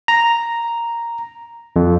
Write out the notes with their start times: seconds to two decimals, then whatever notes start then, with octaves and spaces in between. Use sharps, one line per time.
0.08 A#5
1.76 F2